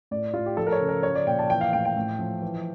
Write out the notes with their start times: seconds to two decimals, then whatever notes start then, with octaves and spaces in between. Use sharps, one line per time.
0.11 A2 D5
0.34 A2 F4
0.46 G4
0.57 F3 A4
0.67 A#4
0.72 C#5
0.80 C#3
0.89 A#4
1.03 F3 C#5
1.15 D5
1.27 A#2 G5
1.39 A5
1.50 E3 G5
1.61 F5
1.73 A2 G5
1.85 G5
1.96 A2
2.19 F3
2.42 E3